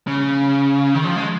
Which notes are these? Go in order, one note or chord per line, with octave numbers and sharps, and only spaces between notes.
C#3
D#3
F3
G#3